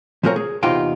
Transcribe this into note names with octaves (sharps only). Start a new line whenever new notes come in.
F3 G#3 C4 A#4 C#5
G#4
E2 C3 D#4 F4 G5